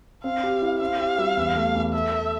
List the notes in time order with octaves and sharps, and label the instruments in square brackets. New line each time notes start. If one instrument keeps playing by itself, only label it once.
[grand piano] C4 [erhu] F5
[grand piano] G4
E4
[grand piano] C4 [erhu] F5
[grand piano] G4
G3
E2
A3
E2
[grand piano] A4 [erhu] E5
[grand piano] A4